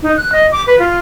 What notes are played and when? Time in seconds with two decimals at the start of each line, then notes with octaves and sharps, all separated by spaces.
0.02 D#4
0.17 F#6
0.32 D#5
0.51 D6
0.67 B4
0.79 F4